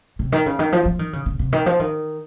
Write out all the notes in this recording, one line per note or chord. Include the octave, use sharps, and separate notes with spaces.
C3
D#3
C#3
D#3
F3
F3
D#3
C#3
C#3
C3
D#3
F3
D#3